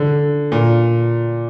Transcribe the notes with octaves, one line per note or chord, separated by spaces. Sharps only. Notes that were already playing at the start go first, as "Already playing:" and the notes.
Already playing: D3
A#2